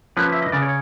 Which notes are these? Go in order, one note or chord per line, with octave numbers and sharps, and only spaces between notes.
F3 A#3 C#4 B4
E5
D#5
C#3 D5
C#5